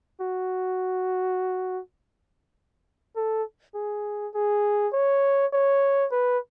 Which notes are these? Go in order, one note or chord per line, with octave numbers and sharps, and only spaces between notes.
F#4
A4
G#4
G#4
C#5
C#5
B4